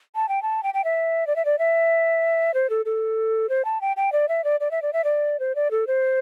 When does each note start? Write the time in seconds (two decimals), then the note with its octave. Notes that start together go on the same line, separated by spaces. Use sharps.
0.15 A5
0.29 G5
0.42 A5
0.63 G5
0.74 G5
0.84 E5
1.27 D5
1.36 E5
1.45 D5
1.59 E5
2.54 C5
2.70 A4
2.85 A4
3.49 C5
3.65 A5
3.81 G5
3.97 G5
4.12 D5
4.29 E5
4.44 D5
4.60 D5
4.71 E5
4.82 D5
4.93 E5
5.04 D5
5.40 C5
5.55 D5
5.71 A4
5.87 C5